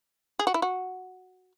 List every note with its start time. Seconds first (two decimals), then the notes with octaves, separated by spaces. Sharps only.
0.39 G#4
0.47 F#4
0.54 E4
0.62 F#4